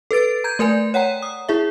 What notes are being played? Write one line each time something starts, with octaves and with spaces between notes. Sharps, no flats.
A4 B4 A6 D7
A#5 G6 G#6
A3 A#4 D5 G#5
C#5 F#5 G5 A#5
D#6
E4 G#4 E5